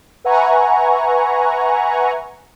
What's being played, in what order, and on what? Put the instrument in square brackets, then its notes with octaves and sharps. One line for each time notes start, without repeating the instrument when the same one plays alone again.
[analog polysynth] B4 E5 F#5 G#5 A#5 C#6